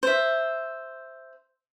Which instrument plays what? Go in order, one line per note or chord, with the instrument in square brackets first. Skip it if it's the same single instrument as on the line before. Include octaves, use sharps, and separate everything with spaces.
[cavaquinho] C5 E5